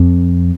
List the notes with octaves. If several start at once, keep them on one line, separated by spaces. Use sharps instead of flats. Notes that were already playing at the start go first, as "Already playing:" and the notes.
Already playing: F2